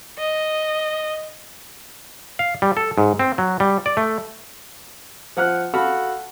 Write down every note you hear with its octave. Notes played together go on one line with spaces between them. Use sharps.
D#5
F5
G3
A4
G#2
C4
F#3
G3
D5
A3
F3 F#5 F6 F#6
F#4 A4 F5 F#5 B5 F6